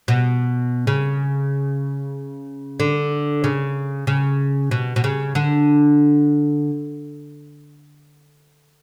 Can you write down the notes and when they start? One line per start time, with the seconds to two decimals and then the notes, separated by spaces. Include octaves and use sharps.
0.08 B2
0.87 C#3
2.80 D3
3.44 C#3
4.07 C#3
4.71 B2
4.96 B2
5.04 C#3
5.35 D3